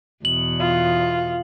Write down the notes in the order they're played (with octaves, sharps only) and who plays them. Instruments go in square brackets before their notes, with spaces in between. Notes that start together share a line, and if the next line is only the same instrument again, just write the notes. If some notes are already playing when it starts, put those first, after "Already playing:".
[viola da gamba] E2 B2 [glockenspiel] F#7
[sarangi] F4